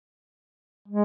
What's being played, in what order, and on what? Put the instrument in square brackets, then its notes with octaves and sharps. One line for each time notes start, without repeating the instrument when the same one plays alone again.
[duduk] G#3